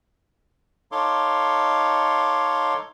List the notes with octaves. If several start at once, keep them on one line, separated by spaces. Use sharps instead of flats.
D#4 A4 C#5 F5 C6 D6